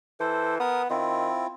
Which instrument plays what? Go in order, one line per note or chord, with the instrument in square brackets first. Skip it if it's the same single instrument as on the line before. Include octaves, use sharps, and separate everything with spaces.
[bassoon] E3 [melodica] A4 C5
[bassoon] B3 [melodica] A#4 D#6
[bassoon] D#3 [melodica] C4 E4 F4